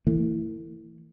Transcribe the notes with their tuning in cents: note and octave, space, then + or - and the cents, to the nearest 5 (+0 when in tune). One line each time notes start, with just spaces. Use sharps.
E3 +0 A3 +40